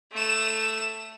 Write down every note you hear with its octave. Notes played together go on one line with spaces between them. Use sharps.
A3 E7